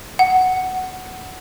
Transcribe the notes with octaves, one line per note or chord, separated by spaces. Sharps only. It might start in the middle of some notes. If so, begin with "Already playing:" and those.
F#5